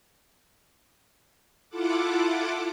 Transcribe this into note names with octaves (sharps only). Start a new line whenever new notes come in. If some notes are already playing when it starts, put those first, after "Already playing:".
E4 F4 A4 F#5 D6